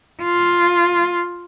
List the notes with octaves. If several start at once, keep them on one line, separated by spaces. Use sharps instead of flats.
F4